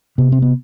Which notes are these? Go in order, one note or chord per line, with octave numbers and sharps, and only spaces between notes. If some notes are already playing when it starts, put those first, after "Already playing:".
C3 B3
C4
B3